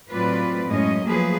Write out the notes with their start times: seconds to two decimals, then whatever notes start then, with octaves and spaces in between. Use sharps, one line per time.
0.11 A2 F#3 C4 F4 B4 D5
0.67 F#2 A2 G#3 C#4 D#5
1.05 F3 F#3 A3 A#3 G#4 B4